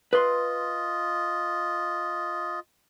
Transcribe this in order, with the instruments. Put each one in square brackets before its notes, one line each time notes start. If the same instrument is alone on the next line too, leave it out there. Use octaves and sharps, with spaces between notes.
[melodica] F4 D#5 [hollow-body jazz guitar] B4 C6